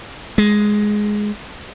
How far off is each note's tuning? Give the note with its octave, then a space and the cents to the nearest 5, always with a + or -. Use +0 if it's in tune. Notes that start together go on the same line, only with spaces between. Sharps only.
G#3 +5